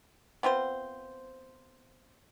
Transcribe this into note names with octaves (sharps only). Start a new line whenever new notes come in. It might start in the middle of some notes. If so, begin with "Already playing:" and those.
B3 C4 F4 C5